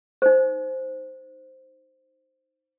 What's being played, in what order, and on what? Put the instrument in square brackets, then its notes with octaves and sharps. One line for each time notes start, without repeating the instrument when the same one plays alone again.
[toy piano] D#4 C5